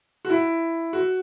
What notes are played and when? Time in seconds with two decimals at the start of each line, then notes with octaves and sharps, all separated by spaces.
0.25 F#4
0.30 E4
0.93 F#4